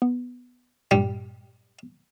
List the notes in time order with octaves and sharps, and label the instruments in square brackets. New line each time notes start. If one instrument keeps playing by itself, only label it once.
[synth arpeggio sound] B3
[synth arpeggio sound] G2 A#2 [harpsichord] G3